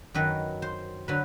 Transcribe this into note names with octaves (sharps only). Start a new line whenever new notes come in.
F#2 D#3 F#3 B4
C5
D3 F#3 B4